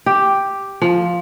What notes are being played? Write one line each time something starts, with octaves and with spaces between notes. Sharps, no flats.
G4
F3